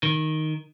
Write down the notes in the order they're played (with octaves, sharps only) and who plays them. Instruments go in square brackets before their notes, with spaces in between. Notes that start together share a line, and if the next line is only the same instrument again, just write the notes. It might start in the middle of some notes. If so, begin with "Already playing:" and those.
[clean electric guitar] D#3